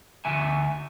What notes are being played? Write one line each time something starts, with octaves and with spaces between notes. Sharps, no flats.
D2 E5 G#5